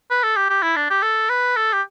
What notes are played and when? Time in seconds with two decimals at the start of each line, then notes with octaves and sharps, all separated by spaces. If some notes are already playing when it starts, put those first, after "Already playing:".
0.10 B4
0.23 A4
0.37 G4
0.50 G4
0.63 E4
0.76 D4
0.90 G4
1.03 A4
1.29 B4
1.56 A4
1.73 G4